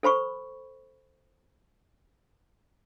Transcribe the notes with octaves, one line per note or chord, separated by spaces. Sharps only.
A4 C5 B5 C#6